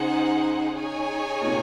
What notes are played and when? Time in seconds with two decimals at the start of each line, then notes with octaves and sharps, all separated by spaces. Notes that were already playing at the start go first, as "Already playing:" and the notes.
Already playing: C#3 D#4 G#4 C5 F#5
0.78 D#4 G#4 C#5 G#5
1.41 A#2
1.46 C3